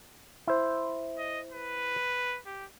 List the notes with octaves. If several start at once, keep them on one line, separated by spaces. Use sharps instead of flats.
E4 C5
D#5
B4
G4